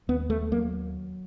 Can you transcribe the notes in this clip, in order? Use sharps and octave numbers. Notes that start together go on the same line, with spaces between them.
D#2 B3
A3
F#3 A#3